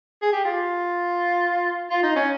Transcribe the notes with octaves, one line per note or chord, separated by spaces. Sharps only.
G#4
G4
F4
F4
D#4
C#4